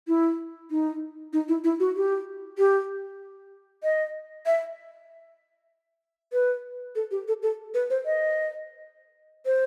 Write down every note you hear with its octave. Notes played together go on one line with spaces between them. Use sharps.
E4
D#4
D#4
E4
E4
F#4
G4
G4
D#5
E5
B4
A4
G4
A4
A4
B4
C5
D#5
C5